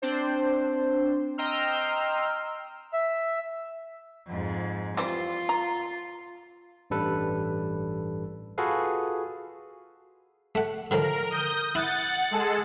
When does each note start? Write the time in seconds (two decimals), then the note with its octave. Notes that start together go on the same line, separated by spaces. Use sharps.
0.02 C4 D4 C5
1.38 D#5 G5 A#5 C6 E6 F6
2.93 E5
4.26 F2 G#2
4.97 E3 G3 C4 F4
5.49 A#5
6.90 A1 G2 G3 A4 B4
8.58 F4 F#4 G#4 A4 B4 F5
10.55 A3 F#5
10.91 D3 D#3 F3 A#4
11.31 D#6 G6
11.75 E4 F#5 A6
12.31 G#3 G#4 A4